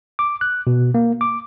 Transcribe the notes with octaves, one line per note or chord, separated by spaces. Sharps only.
D6
F#6
B2
A#3
D6